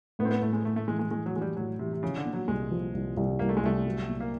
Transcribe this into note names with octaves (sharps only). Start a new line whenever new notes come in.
A2 B3
C4
B3
A2 A3
G#3
A2 A3
A3
E3 G#3
G#3
E3 G#3
F#3
E3 G#3
G3
A2 F#3
C3 E3
C3
C#3 F3
D3
A#2
F#3
C2 G#3
F3
C2
C2
C2 A#3
A3
G#3
C2 A3
F#3
A#2
A#3